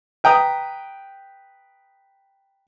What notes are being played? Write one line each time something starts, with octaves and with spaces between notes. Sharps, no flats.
B4 G5 A#5 D#6